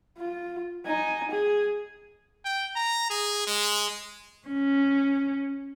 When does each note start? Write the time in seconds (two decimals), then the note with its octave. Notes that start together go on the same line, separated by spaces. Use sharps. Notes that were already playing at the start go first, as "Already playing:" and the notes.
0.18 F4
0.86 D#4 G#5
1.31 G#4
2.45 G5
2.76 A#5
3.10 G#4
3.47 G#3
4.48 C#4